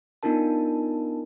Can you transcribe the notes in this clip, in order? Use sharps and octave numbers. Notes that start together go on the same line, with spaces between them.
B3 D4 D#4 F4 A#4 A5